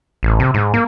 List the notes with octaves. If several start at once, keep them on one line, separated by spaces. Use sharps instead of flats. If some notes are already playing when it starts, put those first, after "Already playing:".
A1
C3
G#2
A#3